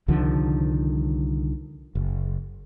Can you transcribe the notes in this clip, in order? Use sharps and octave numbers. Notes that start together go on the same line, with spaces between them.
C2 D3 D#3 F3
F#1